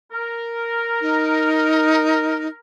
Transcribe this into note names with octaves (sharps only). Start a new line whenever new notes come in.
A#4
D#4